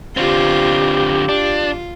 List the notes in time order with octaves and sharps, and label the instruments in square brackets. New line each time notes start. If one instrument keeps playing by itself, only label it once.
[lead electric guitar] D3 C4 [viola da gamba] F4 [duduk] G4
[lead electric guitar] D4 [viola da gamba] F4